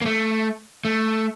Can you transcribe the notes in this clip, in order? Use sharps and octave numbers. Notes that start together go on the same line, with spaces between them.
A#3
A3
A3